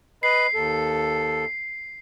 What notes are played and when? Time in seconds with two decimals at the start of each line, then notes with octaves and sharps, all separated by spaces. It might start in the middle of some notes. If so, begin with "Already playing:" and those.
0.23 B4 D#5 B5 C7
0.54 D#2 A4